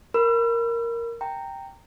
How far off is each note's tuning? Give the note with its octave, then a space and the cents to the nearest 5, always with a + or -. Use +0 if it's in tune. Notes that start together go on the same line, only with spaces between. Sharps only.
A#4 +0 B5 +0 E6 +45
G5 +0 A#5 -15